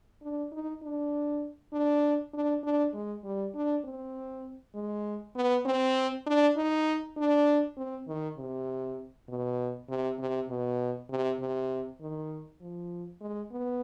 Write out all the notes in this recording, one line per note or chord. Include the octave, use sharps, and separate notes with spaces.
D4
D#4
D4
D4
D4
D4
G#3
G3
D4
C4
G#3
B3
C4
D4
D#4
D4
C4
D#3
C3
B2
C3
C3
B2
C3
C3
D#3
F3
G#3
B3